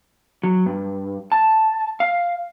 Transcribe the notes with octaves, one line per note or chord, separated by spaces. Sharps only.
F#3
G2
A5
F5